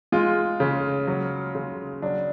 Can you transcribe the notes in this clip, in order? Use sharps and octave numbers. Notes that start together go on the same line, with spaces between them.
G#3 F4
C#3
F#3
C#3
F#3 D4